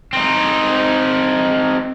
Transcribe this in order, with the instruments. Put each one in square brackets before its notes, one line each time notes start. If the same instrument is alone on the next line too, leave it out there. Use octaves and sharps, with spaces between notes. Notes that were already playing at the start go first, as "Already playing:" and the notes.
[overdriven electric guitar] C4 D#4